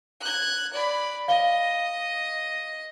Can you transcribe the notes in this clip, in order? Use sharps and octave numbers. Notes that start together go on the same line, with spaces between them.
F#6 G#6
D5 B5
D#5 F5 G7